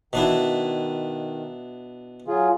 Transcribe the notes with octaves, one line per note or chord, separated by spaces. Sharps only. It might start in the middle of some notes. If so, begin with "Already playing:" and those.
B2 D#3 D4 E4
F#3 F4 G#4